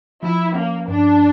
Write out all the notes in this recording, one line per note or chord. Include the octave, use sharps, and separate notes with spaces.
F3 E4
A#3 C#4
G2 D4